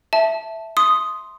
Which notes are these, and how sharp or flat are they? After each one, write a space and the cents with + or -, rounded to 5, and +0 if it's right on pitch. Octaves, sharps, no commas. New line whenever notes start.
E5 +0 A5 +0
C6 +0 D#6 +0